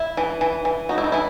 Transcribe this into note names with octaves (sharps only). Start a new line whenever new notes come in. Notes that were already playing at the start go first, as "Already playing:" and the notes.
Already playing: E4
E3
E3
E3
D#4 F#4
E4
D#4
E3 E4